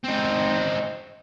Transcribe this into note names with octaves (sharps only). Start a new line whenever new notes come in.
C4 D#4